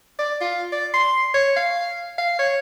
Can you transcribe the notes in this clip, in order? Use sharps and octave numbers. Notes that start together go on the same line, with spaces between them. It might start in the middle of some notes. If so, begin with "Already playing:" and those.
D5
F4
D5
C6
C#5
F5
F5
C#5